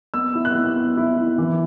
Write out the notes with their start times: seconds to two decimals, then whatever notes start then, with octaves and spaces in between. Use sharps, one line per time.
0.14 B3 E6
0.35 E4
0.45 F#6
0.55 B3
0.76 B3
0.97 E4
1.17 E4
1.38 E3